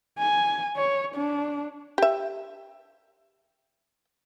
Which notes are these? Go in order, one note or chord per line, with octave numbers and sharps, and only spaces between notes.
G#5
C#5
D4
G4 E5